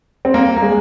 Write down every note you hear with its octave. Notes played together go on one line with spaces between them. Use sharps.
C4
A#3
A#3
G#3